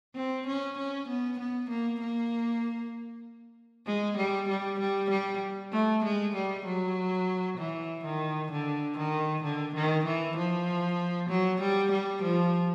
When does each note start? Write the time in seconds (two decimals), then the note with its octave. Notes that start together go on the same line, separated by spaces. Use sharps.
0.15 C4
0.47 C#4
0.78 C#4
1.08 B3
1.39 B3
1.70 A#3
2.00 A#3
3.86 G#3
4.17 G3
4.49 G3
4.80 G3
5.10 G3
5.72 A3
6.04 G#3
6.35 G3
6.66 F#3
7.58 E3
8.05 D#3
8.52 D3
8.98 D#3
9.44 D3
9.75 D#3
10.05 E3
10.37 F3
11.30 F#3
11.61 G3
11.92 G3
12.23 F3